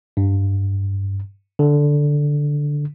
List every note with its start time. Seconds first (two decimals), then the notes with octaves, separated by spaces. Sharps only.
0.17 G2
1.59 D3